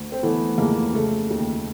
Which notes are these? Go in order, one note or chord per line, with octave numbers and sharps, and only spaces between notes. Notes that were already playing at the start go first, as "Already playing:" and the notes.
Already playing: D2
C4
E3 A3 B3
F2 G#3 A#3
C#3 A3
D#2